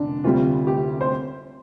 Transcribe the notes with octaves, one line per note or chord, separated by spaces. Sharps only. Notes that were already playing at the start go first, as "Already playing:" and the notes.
Already playing: F1 D3 D4
D2 C3 G3 F4
G4
C5